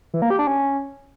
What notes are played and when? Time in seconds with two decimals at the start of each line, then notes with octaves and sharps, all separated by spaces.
0.14 E3
0.22 A#3
0.30 G4
0.39 D4
0.47 C#4